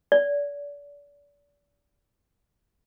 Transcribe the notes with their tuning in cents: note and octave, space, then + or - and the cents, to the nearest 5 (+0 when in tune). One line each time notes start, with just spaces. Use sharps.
D5 -35